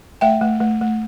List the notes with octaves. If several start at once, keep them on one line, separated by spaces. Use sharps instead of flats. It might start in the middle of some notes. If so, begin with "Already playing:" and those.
A3 E5 G5
A3
A3
A3